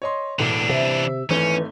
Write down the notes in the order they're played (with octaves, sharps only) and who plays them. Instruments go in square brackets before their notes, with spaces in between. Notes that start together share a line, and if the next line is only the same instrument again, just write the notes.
[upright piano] C#5 D#5 C6
[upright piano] E1 A2 [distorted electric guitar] E3 D4
[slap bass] C3 [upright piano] E5
[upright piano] G#1 A3 G7 [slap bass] E3 [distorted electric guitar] C#4